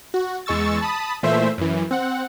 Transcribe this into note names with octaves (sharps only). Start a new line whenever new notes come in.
F#4
E2 G#3 C#6 E6 A6
A5 B5 D#6
A#2 E3 A3 C5 E5
F#2 E3
C4 F#5